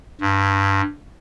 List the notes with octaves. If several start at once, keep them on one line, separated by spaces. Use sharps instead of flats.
G2